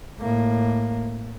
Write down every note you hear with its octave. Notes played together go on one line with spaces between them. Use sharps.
A2 A#3